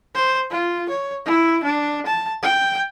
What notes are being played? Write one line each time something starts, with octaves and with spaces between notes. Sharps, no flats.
C5
F4
C#5
E4
D4
A5
G5